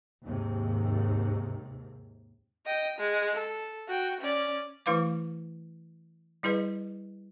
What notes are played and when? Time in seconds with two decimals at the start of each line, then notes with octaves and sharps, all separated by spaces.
0.22 D#2 G#2 C3
2.66 D#5 G5
2.98 G#3
3.33 A4
3.88 F#4 G5
4.21 C#4 D5
4.86 E3 A3 E4 B4 F5 D6
6.43 G3 E4 G#4 B4 D#5